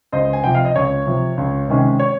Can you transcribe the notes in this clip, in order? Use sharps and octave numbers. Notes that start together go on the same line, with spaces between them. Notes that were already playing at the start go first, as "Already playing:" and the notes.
C#2 C5 D#5
G#5
C3 F3 G5
F5
D#5
C#2 C#5
C3 F3
C#2
C3 D#3 G#3 C#4
C#5